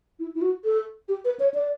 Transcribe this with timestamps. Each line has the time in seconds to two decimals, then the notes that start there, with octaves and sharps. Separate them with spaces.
0.19 E4
0.35 E4
0.42 F#4
0.64 A4
1.09 G4
1.25 B4
1.40 C#5
1.54 D5